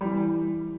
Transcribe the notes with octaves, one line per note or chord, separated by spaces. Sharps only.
G3
E3